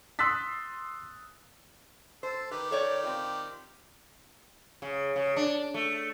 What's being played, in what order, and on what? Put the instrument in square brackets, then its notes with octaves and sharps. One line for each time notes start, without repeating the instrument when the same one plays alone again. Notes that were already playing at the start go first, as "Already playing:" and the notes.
[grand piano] C6 D#6 E6 F#6 A6 B6
[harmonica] A4 [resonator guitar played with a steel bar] C5
[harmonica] D#3 G4 [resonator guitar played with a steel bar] B4
[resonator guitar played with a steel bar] A4 C#5 D5
C4 F4
[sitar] C#3
C#3
D4
A3